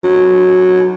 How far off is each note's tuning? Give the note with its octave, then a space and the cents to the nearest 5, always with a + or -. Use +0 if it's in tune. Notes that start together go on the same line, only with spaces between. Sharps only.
F#3 -10